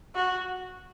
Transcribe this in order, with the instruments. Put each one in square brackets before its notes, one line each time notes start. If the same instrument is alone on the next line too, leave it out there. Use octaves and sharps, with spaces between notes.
[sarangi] F#4